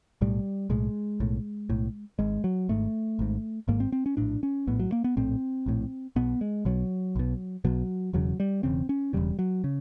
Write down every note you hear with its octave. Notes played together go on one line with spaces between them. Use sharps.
B1 A2 G3
B1 A2 G#3
B1 A2
B1 A2
G#1 G#2 G#3
F#3
G#1 G#2 A3
G#1 G#2
G#1 G#2 A#3
C4
C4
C#4
A#1 A2 D4
C#4
A#1 A2 B3
F#3
A#3
B3
A#1 A2 C4
A#1 A2
B1 B2 B3
G#3
B1 B2 F#3
B1 B2
B1 B2 F#3
E1 E2 C#3 F#3
G3
E1 E2 C#3 C4
C#4
E1 E2 C#3 G3
F#3
C#3